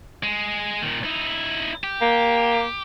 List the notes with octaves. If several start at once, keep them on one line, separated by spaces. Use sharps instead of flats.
G#3
A#2 D#3
D#4 E4
G4
A#3